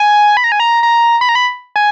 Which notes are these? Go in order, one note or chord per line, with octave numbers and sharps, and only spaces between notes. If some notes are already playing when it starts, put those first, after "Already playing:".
Already playing: G#5
B5
A#5
G#5
A#5
A#5
B5
A#5
B5
G#5